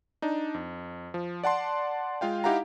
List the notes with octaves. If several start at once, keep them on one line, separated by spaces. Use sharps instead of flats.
D4 D#4
F2
F3
D5 F#5 A5 C6
G#3 F4 F5 G5
D#4 E4 G4 F5 F#5 A#5